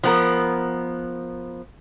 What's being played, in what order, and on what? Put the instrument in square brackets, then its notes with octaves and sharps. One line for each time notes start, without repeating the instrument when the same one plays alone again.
[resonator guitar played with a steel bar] F3 B3 A#4